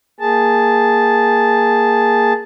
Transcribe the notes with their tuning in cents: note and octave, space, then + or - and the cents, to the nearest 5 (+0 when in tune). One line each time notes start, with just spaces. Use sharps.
A#3 +0 G#4 -10 A5 -5